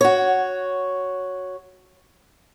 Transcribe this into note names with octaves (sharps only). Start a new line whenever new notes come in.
F#4 C#5